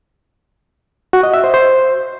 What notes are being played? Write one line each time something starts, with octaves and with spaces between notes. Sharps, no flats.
F#4
D#5
E5
C5
C5